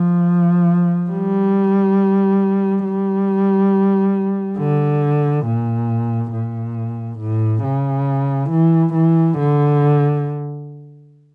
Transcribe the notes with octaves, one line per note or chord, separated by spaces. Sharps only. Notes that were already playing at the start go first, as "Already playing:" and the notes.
Already playing: F3
G3
G3
D3
A#2
A#2
A2
C#3
E3
E3
D3